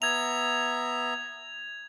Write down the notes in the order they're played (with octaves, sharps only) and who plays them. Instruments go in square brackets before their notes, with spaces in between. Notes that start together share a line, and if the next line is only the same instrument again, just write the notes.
[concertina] B3 E5 A#5 [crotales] G#6 F7